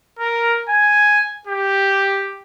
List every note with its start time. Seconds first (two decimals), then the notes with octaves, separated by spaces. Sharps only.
0.19 A#4
0.69 G#5
1.47 G4